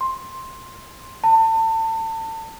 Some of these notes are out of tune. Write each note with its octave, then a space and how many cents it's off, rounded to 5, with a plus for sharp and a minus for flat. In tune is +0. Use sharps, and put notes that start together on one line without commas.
C6 +10
A5 +30